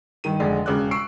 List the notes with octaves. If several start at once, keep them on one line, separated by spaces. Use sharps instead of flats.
G2 D#3 D#7
F1 D3 G#3 D5
E1 C#3 D6 F#6
C#6 E6 C7 D7